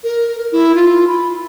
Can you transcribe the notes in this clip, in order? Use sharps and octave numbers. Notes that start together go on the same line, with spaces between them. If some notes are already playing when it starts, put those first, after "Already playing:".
A#4
A#4
E4
F4
B5